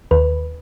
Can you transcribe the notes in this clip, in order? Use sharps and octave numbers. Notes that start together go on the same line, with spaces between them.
D#2 B4